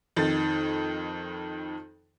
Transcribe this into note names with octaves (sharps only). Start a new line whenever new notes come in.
F2 D#3 A6